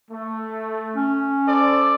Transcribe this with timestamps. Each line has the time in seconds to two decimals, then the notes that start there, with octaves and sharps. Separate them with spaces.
0.11 A3
0.96 C#4
1.49 A4 C5 D5